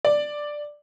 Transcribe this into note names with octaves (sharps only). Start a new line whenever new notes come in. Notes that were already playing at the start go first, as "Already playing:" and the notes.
D5